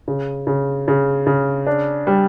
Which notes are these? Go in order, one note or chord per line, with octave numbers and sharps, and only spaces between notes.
C#3
C#3
C#3
C#3
D4
G3